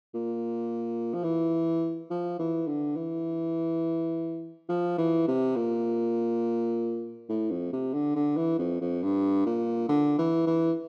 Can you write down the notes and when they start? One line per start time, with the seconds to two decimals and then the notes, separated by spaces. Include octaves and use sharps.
0.14 A#2
1.14 F3
1.23 E3
2.10 F3
2.39 E3
2.67 D3
2.96 E3
4.69 F3
4.98 E3
5.28 C3
5.56 A#2
7.29 A2
7.50 F2
7.73 C3
7.94 D3
8.15 D3
8.37 E3
8.59 F2
8.81 F2
9.03 G2
9.46 A#2
9.89 D3
10.18 E3
10.46 E3